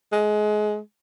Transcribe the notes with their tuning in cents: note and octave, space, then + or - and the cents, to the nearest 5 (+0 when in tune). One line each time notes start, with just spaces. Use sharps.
G#3 +25